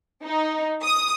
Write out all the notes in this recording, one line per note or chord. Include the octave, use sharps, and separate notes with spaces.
D#4
D#6